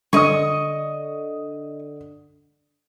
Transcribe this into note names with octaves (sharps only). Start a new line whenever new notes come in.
D3 D#5 C#6 D#6